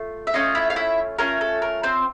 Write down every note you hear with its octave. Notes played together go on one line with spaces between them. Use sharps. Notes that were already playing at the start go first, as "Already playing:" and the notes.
Already playing: A3 F4
E5
A3 C#4 F4 D#5
E4 E5
F5
E4 E5
A3 C#4 F4 A#4
A4
A#4
C4 C5